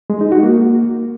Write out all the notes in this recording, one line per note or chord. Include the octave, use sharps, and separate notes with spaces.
G#3
D#4
F#4
A#3